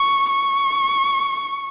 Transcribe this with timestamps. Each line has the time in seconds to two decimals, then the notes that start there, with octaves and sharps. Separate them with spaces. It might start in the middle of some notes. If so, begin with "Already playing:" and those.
Already playing: C#6
0.29 C#6